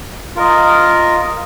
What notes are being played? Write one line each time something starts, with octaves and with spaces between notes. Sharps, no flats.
F4 A#4 D#5